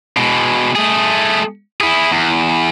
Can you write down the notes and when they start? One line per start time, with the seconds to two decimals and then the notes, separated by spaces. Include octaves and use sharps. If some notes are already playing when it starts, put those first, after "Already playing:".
0.17 B2 G#3
0.76 A3 G#4
1.81 E4 G#4
2.11 E2